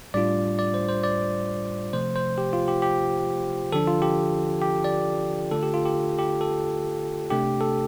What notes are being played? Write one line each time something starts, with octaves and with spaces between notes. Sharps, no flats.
A2 G3 D4 F4 D5
D5
C5
C5
D5
C3 F3 A3 C5
C5
G4
F4
G4
G4
D3 F3 D4 A4
F4
G4
G4
D5
D3 A3 F4 A4
G4
F4
G4
G4
A4
C3 A3 D4 G4
A4